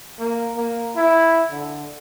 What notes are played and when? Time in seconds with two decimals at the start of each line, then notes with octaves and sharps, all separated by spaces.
0.19 A#3
0.57 A#3
0.96 E4
1.51 D3